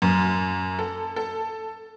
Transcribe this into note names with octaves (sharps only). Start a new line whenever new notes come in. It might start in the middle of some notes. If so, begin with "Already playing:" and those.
F#2
A4
A4